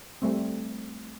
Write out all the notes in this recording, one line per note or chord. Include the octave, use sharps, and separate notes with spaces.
G3 A3 C4